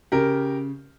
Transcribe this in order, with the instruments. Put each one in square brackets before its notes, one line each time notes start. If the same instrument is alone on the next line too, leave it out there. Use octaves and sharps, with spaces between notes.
[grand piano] C#3 G4 A#4